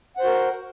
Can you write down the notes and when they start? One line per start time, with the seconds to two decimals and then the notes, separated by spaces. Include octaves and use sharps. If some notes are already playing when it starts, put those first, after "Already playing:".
0.17 F#5
0.20 C5
0.23 F#4
0.27 A#4